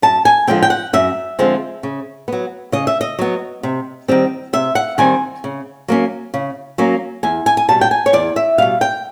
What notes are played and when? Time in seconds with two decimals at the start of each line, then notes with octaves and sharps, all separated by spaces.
0.02 F#2 A5
0.25 G#5
0.47 D3 F3 G#3 C4 G5
0.62 G5
0.70 F#5
0.93 F#2 E5
1.39 D3 F3 G#3 C4
1.83 C#3
2.28 F#3 B3
2.72 C#3 D#5
2.87 E5
3.01 D#5
3.19 F#3 B3
3.63 C3
4.08 D#3 G3 C4
4.53 C3 E5
4.75 F#5
4.98 D#3 G3 C4 G#5
5.44 C#3
5.88 F#3 A#3 C#4
6.34 C#3
6.78 F#3 A#3 C#4
7.23 E2 G#5
7.46 G#5
7.57 G#5
7.68 B2 G3 A5
7.81 G5
7.91 G#5
8.06 C#5
8.13 E2 D5
8.36 E5
8.58 B2 G3 F5
8.81 G5